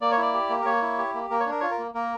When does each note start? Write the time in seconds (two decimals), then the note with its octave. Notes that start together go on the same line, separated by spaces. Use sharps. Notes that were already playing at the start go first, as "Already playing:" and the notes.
0.01 A#3 D5
0.11 C#5
0.18 E4 D5
0.34 G4
0.50 A#3
0.61 A#4
0.65 A#3 C#5
0.82 E4
0.98 G4
1.14 A#3
1.30 A#3 A#4
1.40 C#5
1.46 D4 A#4
1.60 F4 C#5
1.71 A#4
1.78 A#3
1.94 A#3 A#4